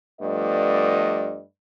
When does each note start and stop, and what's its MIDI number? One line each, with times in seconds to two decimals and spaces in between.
0.21 1.40 43
0.21 1.40 53
0.21 1.40 57
0.21 1.40 59
0.21 1.40 74
0.21 1.40 75